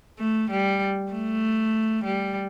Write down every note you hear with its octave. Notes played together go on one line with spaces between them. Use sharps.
A3
G3
A3
G3